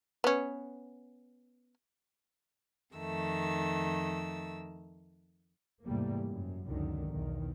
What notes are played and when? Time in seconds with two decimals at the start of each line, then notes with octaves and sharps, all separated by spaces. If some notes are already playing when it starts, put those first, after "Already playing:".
0.24 B3 C#4
2.95 F2 D#3 A3 E6
5.84 E2 G#2 C3 G3 A3 A#3
6.26 F#2
6.66 C#2 F#2 D3 D#3
7.09 B1 E2 D#3